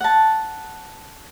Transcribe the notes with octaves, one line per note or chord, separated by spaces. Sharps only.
F#5 A5